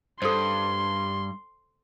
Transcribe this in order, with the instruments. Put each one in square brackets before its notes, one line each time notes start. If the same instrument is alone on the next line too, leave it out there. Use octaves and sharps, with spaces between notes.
[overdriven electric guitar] G2 [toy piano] A4 C5 [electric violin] C6